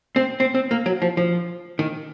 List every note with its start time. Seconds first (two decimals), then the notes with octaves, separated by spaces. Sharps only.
0.16 C4
0.40 C4
0.55 C4
0.71 A#3
0.86 F#3
1.02 F3
1.17 F3
1.79 D#3